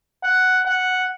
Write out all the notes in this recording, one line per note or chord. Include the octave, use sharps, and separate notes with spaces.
F#5
F#5